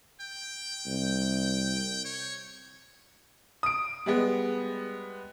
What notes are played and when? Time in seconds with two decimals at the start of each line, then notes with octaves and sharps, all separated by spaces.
0.20 G5
0.86 C2
2.05 C#5
3.63 D#6 D7
4.06 G3 G#3 B3